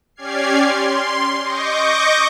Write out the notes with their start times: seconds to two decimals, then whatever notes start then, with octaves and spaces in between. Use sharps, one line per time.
0.16 C#4 G4 D5 F6 G#6 C7
0.60 C6
1.42 D#5 C#6 D6 G6 A#6